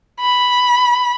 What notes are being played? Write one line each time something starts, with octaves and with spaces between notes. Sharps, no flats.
B5